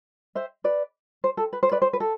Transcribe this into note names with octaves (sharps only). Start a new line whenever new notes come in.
C5 E5
B4 D5
C5
A4
B4
C5
B4 D5
C5
B4
A4